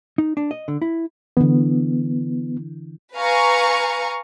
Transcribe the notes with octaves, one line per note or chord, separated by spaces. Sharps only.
D#4
D4
D#5
D3
E4
D3 E3 B3
B4 F5 G#5 A#5 C#6